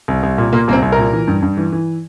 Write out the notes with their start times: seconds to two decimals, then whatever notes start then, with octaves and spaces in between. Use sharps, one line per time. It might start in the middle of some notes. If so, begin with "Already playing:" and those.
0.08 C2
0.23 C2
0.38 A#2
0.53 A#2 A#3
0.68 C2 A#3
0.73 C4
0.82 C2
0.92 A#4
0.98 A#2
1.13 E3
1.28 G2
1.42 G2
1.57 E3
1.72 E3